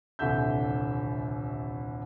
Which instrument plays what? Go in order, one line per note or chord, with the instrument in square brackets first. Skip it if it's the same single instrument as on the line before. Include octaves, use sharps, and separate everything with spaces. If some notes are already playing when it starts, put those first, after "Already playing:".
[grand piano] D#1 C2 D3 E5 G6